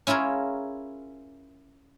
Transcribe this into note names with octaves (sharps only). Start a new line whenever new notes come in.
C#4 E4 F4 G#4 A#4